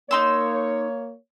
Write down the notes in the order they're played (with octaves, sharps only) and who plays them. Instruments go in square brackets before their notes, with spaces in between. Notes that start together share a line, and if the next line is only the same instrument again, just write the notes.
[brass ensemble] A#3 C#5 [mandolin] D#4 C6 E6